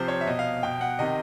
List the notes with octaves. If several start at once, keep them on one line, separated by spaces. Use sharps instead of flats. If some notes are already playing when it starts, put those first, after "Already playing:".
Already playing: C3 F3 C5
C#5
E5
B2 D#5
F5
B2 G5
F#5
C3 D#3 D#5